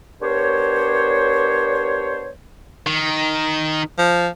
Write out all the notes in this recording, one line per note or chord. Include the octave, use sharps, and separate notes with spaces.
B3 D4 G4 A#4 C5 C#5
D#3
F3